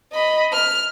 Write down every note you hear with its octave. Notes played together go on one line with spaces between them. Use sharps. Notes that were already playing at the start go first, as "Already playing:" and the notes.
D#5 B5
F6